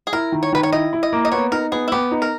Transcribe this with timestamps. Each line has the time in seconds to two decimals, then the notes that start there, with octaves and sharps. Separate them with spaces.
0.07 G#4
0.13 E4 A#4
0.32 D#3
0.43 C#5
0.53 D#3 B4
0.63 C#5
0.72 E4 D#5
0.93 E4
1.03 D#5
1.13 A#3
1.25 D#5
1.32 B3 C#5
1.52 D#4 A#4
1.72 B3 G#4
1.88 E4
1.92 B3 G4
2.11 D#4
2.22 A#4